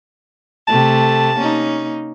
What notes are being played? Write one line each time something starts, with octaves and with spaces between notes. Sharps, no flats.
C3 A3 A5
A#3 C#4 D#4